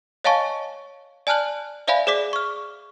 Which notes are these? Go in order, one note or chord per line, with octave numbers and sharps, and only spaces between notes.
C#5 D#5 F5 G#5 A5 C#6
D5 G#5 A5 F6 F#6 F#7
C5 D5 E5 F5 G#5 B5
G#4 C5 D5 D6 B6
C#6 F6